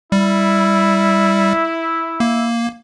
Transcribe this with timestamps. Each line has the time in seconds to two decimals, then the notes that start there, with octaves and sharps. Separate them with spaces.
0.12 G3 E4
2.20 A#3